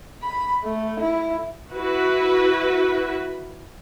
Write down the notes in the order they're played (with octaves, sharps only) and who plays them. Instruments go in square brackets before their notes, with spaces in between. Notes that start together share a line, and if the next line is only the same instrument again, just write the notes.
[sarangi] B5
A3
E4
[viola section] E4 F#4 B4